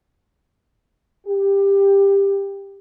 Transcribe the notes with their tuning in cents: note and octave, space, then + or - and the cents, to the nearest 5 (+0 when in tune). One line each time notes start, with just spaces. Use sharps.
G4 +15